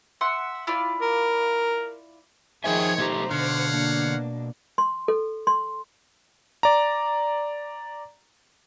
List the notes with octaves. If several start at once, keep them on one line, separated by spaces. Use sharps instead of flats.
E5 F#5 C6
E4 F4 D5
A#4
D#3 F3 G#4 C5 C#5 E5 G5 G#5
B1 A3 G4 C5 A#5
B2 D3 C#5 F5 F#5
A#3 D4
C6
A4
C6
D5 A#5